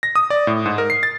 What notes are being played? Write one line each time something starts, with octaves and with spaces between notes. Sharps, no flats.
A#6
D#6
D5
A2
G#2
A#4
C7
A6